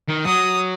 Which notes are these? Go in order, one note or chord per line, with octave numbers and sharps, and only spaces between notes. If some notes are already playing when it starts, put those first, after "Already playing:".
D#3
F#3 D#6